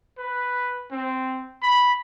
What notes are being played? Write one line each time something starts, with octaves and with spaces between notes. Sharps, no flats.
B4
C4
B5